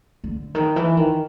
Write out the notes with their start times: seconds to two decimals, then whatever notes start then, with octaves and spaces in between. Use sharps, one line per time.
0.24 D3
0.55 D#3
0.76 E3
0.97 D#3